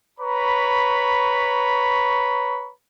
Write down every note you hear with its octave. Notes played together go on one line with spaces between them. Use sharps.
B4 C#5 A#5 B5 C#6